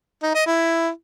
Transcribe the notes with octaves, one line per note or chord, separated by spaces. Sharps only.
D#4
D#5
E4